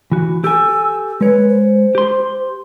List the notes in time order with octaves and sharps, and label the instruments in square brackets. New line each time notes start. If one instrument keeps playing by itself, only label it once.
[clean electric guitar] E3 F#4
[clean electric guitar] G4 A4 G#5 [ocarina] E6
[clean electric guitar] G#3 C#5 [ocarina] B4
[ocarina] C5
[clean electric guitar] G4 C6